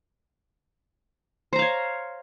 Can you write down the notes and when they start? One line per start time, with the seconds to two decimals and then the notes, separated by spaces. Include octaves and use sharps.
1.53 C5
1.56 A#5
1.59 F5
1.62 C#5